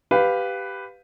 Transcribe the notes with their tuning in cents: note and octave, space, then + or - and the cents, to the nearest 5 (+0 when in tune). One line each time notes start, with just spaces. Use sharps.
G4 +0 B4 +10 F5 +10